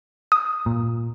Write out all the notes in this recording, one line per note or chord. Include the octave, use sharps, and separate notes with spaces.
D#6
A#2